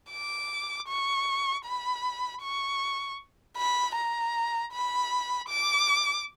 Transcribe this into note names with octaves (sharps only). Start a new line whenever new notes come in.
D6
C#6
B5
C#6
B5
A#5
B5
D6